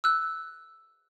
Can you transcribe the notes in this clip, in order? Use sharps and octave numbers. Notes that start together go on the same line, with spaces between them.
E6 F#6